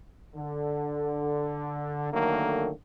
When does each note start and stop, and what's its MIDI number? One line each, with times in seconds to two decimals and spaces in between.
0.35 2.10 50
2.12 2.71 50
2.12 2.71 51
2.12 2.71 54
2.12 2.71 57
2.12 2.71 58